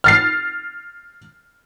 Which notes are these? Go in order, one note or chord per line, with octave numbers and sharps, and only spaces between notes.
F6 A6 C7